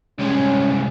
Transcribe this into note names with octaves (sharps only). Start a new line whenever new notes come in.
C2 G#3 C#4